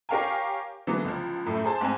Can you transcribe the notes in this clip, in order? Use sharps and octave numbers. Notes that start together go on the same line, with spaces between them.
G4 A#4 C#5 F5 G5 G#5
D3 E3 F#3 G#3 A#3 B3
C#2 F3
F#2 A2 A3
G#4 C5 A5
G#2 C4 G#5